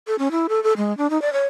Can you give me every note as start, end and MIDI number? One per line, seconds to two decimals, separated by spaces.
0.07 0.16 69
0.19 0.31 61
0.31 0.47 64
0.49 0.62 69
0.63 0.73 69
0.77 0.96 56
0.97 1.10 62
1.10 1.21 63
1.22 1.32 74
1.33 1.46 73